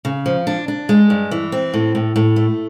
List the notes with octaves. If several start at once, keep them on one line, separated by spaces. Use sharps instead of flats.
C#3
F3
D4
D4
G#3
G2
E3
C4
A2
A2
A2
A3